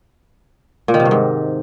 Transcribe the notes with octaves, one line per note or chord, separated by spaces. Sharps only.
A#2
D#3
C3
G2
G#2